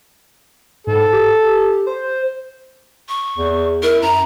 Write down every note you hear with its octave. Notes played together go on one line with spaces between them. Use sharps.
G#2 A4
G4
C5
C#6
E2
E4 A#4
F#2 A#5